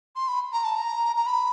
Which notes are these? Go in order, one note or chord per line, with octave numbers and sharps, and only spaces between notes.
C6
B5
A#5
A5
A#5
A#5
B5